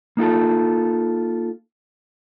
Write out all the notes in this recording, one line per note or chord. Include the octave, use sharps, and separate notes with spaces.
A#3 D#4 F4 A4